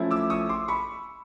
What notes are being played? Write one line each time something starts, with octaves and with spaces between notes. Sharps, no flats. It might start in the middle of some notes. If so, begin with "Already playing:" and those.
Already playing: F3 A3 C#4 E4
D6 E6
C#6 D#6
C6 D6
B5 C#6